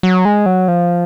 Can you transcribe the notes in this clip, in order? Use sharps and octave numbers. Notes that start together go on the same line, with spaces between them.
F#3
G#3
F#3
F3